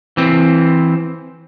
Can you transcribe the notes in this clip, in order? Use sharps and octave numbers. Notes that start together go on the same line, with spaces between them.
E3 C4